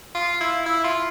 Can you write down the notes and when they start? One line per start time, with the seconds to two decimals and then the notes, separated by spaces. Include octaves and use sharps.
0.15 F4
0.41 E4
0.66 E4
0.84 F4